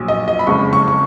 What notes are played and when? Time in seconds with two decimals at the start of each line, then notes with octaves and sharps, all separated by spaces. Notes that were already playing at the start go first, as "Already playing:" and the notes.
Already playing: A#1 A#2 F#3
0.08 D#5
0.28 D#5
0.39 B5
0.47 F#1 F2 C#3 G#3 C#6
0.73 C#6
0.88 C#6